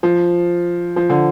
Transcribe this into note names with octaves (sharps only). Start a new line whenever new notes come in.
F3
F3
D3